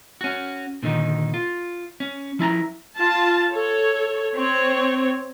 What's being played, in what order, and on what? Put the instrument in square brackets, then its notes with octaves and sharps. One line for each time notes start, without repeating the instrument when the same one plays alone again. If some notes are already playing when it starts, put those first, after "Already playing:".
[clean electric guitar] C#4 F#4
A#2 D3 D#3 D#4
F4
C#4
F3 E4 A5 A#5
[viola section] F4 A5
A4 C#5
C4 C#5